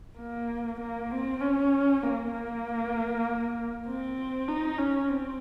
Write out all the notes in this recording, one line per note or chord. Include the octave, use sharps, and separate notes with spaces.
A#3
A#3
C4
C#4
A#3
A#3
C4
D#4
C#4
C4